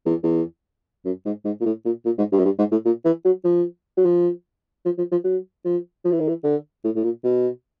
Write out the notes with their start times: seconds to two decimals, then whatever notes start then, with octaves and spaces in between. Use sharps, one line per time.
0.05 E2
0.23 E2
1.05 F#2
1.25 G#2
1.45 G#2
1.61 A#2
1.65 A2
1.85 A#2
2.05 A#2
2.18 G#2
2.32 G2
2.39 F#2
2.45 G2
2.58 G#2
2.71 A2
2.85 A#2
3.05 E3
3.25 F#3
3.44 F3
3.97 F#3
4.05 F3
4.85 F3
4.98 F3
5.11 F3
5.24 F#3
5.65 F3
6.05 F3
6.12 E3
6.20 D#3
6.28 E3
6.44 D3
6.84 A2
6.95 A2
7.03 A#2
7.24 B2